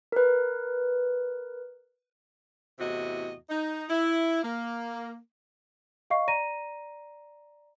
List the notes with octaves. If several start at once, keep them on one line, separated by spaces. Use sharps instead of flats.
A#4 B4
E2 A2 C3 F#4 D#5
D#4
E4
A#3
D#5 F5 C#6 C7
D5 A#5 A#6 D#7